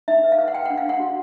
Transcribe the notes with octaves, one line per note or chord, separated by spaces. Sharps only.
D#4 E5
B4
F5
B4
F#5
B4 G5
F#5
D4
F5
D4 F#5
F#4